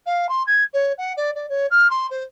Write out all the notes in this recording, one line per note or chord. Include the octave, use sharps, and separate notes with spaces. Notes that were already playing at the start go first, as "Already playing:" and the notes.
F5
C6
G#6
C#5
F#5
D5
D5
C#5
F6
C6
C5